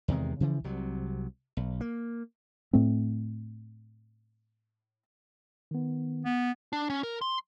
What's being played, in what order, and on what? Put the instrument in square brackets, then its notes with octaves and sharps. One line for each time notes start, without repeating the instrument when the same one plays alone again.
[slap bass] E2 C3 D#3 G#3
C#3 E3 F3
C2 C3 F#3
B1
A#3
[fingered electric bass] A2 A3 C4
[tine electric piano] D#3 B3
[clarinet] B3
[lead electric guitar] D4
C#4
A#4
C6